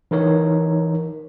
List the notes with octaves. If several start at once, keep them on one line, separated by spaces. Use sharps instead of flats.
E3 D#4 A#4 C#5